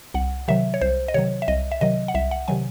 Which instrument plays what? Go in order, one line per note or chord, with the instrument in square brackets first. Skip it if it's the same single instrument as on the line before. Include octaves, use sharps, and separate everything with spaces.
[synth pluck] C2 F#5
C3 D#3 F#3 E5
C#5
C2 C5
D#5
C3 D#3 F#3 C#5
E5
C2 D#5
E5
C3 D#3 F#3 D#5
F#5
C2 E5
F#5
C3 D#3 F#3 G#5